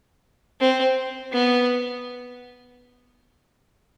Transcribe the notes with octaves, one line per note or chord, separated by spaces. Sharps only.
C4
B3